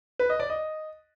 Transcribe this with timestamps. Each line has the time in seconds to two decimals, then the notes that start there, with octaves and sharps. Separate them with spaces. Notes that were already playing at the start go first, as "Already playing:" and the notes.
0.19 B4
0.29 D#5
0.40 D5
0.50 D#5